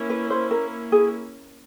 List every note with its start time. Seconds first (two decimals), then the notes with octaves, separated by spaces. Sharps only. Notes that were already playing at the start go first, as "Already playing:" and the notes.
Already playing: A#3 C#4 E4
0.10 B4
0.30 C5
0.51 A#4
0.92 G#4